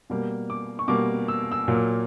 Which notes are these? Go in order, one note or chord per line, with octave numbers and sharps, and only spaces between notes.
B2 G3 A#3
D6
C#6
B2 G3 A#3 D6
E6
E6
A#2 F#3 A#3